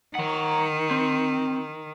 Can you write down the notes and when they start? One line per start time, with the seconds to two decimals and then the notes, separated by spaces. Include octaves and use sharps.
0.15 D#3 F#5 A#5
0.91 C4